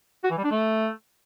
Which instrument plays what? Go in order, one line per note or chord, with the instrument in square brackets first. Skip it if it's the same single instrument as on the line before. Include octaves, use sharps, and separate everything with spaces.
[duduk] F#4
E3
G3
D4
A3